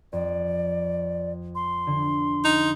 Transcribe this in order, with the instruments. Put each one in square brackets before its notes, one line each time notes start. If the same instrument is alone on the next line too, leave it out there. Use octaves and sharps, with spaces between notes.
[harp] F2 [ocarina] D5
[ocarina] C6
[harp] D3
[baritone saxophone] D#4